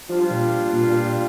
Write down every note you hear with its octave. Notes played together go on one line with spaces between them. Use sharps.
F3 G3 D4 F4
A#2
A#2
A#2
A#2